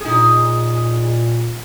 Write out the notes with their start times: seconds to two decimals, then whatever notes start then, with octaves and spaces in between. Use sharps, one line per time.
0.01 A#2 D#4 G#4